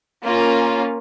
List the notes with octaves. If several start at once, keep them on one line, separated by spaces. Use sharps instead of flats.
A#3 C#4 F4